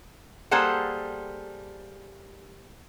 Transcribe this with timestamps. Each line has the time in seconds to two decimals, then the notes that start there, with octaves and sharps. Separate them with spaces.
0.51 G3 A#3 G#4 A4 C5 F#5